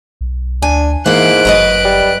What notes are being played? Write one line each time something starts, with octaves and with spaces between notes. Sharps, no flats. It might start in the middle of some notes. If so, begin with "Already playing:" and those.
B1
D2 D4 G#5
G#2 E3 A#3 E4 F#6 D7
G1 F#2 B4 D#5
G3